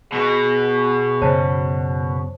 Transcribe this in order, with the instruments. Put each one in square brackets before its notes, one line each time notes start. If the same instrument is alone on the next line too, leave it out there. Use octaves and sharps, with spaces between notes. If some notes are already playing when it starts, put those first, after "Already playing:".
[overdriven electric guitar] B2 F#4 [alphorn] G#4
[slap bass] F#2 C#3 [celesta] C5 C#5 A5